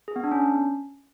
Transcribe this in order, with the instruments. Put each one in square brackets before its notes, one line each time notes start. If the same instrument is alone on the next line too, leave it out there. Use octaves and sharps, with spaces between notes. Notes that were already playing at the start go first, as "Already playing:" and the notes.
[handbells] G#4
B3
D4
C#4